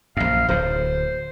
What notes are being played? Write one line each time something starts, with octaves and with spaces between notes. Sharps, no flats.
A#1 F#2 F5
D1 A2 C5